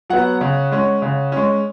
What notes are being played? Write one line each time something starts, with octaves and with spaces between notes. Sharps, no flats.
F#3 B3 F#5
C#3
G#3 C#4
C#3
G#3 C#4